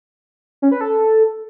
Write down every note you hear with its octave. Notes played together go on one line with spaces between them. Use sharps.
C#4
B4
A4